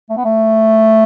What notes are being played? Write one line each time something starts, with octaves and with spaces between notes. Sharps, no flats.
A3
B3
A3